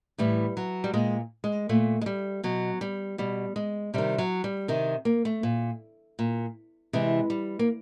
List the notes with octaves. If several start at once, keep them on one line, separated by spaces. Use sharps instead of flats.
A2 E3 G3
F#3
G3
A#2 G#3
G#3
A#2 A3
G#3
G3
B2 F#3
G3
B2 G3
G#3
C3 D#3 G3
F#3
G3
C3 D#3
A#3
A3
A#2
A#2
C3 E3 G#3
G3
A#3